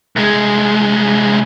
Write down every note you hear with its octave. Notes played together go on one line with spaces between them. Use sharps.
C2 G#3